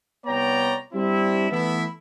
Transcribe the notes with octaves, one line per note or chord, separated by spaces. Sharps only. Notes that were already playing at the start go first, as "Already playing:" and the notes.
C2 B3 C#5 D5 G5 A#5
G3 C4 D4 E4
E3 A3 B3 E4